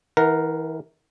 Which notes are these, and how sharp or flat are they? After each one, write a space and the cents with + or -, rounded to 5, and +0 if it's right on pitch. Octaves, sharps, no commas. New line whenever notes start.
E3 -35 A#4 +0 F#5 +0